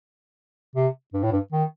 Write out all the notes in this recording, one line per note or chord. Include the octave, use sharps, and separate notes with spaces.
C3
G2
A2
G2
D#3